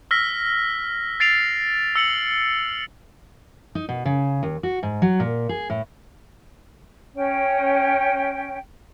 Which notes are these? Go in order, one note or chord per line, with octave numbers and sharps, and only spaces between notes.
E6 F6 A#6 B6
A6 C7 D7 F7
E6 C#7 F#7
D#4
B2
C#3
D#2
F#4
G#2
F#3
A#2
G#4
A2
C#4 G5